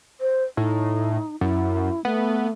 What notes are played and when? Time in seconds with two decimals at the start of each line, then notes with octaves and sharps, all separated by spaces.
0.21 C5
0.57 A2 D#4
1.41 F#2 E4
2.05 A3 B3